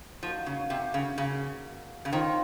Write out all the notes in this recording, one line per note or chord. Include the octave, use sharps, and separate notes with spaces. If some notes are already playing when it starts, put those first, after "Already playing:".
F3 A#3 D#4 F#4 A#4
C#3
C3
C#3
C#3
C#3
D#3 C4 F4 A#4 C#5